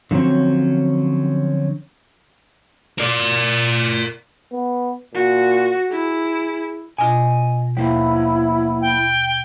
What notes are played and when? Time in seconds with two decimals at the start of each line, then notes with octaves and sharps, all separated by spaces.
0.11 D3 F3 F#3 C4 C#4
2.98 A#4 D5
4.52 B3
5.14 A#2 F#4
5.91 E4 G#4
6.98 B2 D4 F4 D#5 G#5
7.77 D#2 F3 A#3 B3 E4
8.81 G5